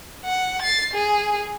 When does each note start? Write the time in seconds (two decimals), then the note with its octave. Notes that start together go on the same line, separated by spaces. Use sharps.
0.25 F#5
0.62 A6 C7
0.94 G#4